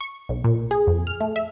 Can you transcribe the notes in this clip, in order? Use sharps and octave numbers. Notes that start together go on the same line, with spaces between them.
C#6
B1
A#2
G#4
F2
F6
A3
E5